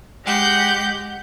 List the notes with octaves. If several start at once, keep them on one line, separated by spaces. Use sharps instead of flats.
G#3 G4 F#5 G6